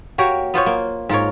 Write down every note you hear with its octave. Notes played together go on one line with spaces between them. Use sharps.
A#3 F#4 G4 C#5
B3 F4 C5 C#5
A#3
G#2 F4 A#4 C#5